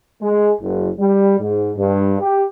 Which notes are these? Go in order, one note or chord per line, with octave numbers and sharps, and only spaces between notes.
G#3
F#1
G3
G#2
G2
G4